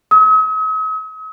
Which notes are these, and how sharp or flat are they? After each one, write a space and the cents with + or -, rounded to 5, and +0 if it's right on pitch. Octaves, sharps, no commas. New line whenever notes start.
D#6 +45